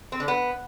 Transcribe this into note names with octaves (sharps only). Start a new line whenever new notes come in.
C4
D3
B3